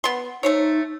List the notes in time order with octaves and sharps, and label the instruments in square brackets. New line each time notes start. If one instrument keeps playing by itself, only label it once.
[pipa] B3 C6
[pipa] A3 C5 C#5 [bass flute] D#4